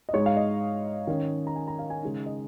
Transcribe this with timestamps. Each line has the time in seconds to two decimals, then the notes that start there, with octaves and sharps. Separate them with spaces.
0.09 D#5
0.13 G#2 G#3 D#4 C#5
0.26 F5
0.37 D#5
1.07 D#3 C#4
1.47 A#5
1.56 G#5
1.68 A#5
1.79 F5
1.90 G#5
2.03 C#3 G#3 D#4
2.26 D#5